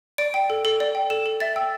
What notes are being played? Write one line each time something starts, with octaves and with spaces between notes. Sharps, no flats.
D5 D7
G5
A4
A4
D5
G5
A4 E7
A4
E5 A6
G5 E6